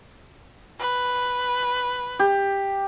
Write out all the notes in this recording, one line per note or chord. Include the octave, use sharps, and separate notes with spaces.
B4
G4